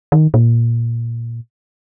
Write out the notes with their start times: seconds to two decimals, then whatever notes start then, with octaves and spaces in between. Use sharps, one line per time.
0.12 D#3
0.34 A#2